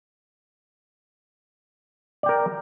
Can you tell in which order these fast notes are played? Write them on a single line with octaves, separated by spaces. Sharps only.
D5 G5 A#4